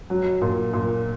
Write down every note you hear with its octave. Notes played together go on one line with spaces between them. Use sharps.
F#3
A#2
A#2